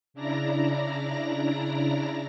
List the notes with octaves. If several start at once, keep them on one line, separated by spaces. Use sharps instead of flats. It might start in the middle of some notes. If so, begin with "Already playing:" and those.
C#3 D4 E4 D5 A#5 A#6